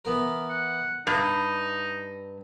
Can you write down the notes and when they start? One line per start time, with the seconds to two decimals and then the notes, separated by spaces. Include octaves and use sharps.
0.05 E3 B3 A#4
0.50 F#5
1.07 G2 D#4 A5 A#5